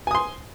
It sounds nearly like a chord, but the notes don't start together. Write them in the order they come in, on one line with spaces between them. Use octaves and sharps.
G#5 D#6 C6